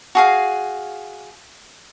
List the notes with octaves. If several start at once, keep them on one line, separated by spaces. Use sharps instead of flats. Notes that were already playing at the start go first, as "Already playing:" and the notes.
F#4 G#4 F5